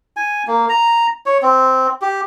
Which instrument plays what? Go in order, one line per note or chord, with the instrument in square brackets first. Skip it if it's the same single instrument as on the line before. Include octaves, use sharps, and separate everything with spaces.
[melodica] G#5
A#3
A#5
C#5
C4
G4